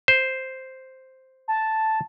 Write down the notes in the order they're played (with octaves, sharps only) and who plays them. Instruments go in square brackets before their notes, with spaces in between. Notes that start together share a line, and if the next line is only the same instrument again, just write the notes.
[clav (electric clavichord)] C5
[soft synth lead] A5